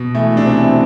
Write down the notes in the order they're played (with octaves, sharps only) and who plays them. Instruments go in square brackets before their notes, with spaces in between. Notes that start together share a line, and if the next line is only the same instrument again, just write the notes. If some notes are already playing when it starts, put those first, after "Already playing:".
Already playing: [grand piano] B2
E3 A3
C3 D4
C4
E3